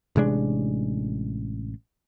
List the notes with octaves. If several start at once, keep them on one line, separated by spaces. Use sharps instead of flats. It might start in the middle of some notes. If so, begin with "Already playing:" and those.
A1 C3 G#3 D4